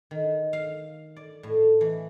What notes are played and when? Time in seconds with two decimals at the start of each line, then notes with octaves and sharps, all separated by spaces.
0.11 D#3
0.53 F5
1.16 D5
1.43 A2
1.81 E3